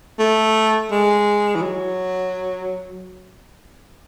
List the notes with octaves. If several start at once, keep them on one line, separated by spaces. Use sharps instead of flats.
A3
G#3
E3
F#3